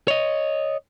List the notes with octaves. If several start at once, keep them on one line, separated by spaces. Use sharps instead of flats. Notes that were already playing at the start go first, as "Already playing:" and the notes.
C#5 D#5